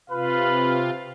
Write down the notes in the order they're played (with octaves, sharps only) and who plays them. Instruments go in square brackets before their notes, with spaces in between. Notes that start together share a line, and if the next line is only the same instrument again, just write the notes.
[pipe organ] C3 F4 [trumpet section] B4 F5 B5